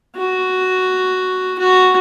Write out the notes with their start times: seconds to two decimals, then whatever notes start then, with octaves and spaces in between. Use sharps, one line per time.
0.16 F#4
1.59 F#4